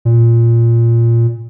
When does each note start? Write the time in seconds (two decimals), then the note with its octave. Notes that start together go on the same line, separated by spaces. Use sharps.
0.05 A#2